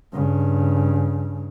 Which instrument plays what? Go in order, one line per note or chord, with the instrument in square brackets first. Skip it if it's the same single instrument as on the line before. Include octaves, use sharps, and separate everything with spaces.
[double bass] G2 C#3